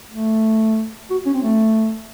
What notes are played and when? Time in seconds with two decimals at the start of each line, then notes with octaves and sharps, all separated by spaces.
0.12 A3
1.10 F#4
1.26 C#4
1.34 C4
1.43 A3